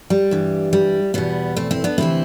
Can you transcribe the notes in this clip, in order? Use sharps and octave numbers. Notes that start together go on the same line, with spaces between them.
G3
G2 E3
G3
E2 B2 G3 B3
A3 C4
C4 E4
B3 D4
D2 C3 E3 C4 E4